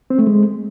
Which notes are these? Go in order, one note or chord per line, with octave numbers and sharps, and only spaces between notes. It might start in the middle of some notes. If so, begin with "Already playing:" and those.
C4
A3
G#3